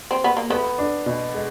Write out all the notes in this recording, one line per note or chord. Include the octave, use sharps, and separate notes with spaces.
C4
B3
A#3
A3 B3
D4
B2
G#3